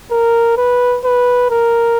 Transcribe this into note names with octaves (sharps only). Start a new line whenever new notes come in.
A#4
B4
B4
A#4